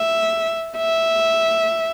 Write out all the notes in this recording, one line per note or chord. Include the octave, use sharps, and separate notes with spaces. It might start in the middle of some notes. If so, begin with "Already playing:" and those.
Already playing: E5
E5